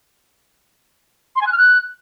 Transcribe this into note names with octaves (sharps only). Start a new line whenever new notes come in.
C6
G#5
F#6
F6
F#6